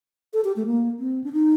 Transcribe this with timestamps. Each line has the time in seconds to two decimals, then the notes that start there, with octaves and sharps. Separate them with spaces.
0.33 A4
0.44 G4
0.56 A3
0.66 A#3
0.99 C4
1.24 D4
1.33 D#4